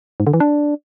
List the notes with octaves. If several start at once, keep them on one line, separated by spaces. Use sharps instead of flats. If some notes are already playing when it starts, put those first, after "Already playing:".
G#2
D3
E3
D4